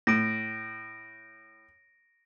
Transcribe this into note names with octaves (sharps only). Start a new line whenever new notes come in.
A2 A#6 D7